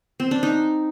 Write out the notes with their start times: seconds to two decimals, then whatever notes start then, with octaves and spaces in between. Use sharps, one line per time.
0.20 C4
0.31 D4
0.43 D#4